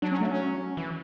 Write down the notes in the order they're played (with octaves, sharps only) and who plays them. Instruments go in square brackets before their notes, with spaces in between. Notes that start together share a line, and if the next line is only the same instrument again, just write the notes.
[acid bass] F#3 [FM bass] D4
[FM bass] C#4
A3
C#4
[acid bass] E3